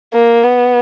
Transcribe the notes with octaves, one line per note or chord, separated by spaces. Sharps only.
A#3
B3